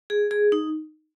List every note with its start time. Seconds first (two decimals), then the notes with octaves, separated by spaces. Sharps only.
0.10 G#4
0.31 G#4
0.52 D#4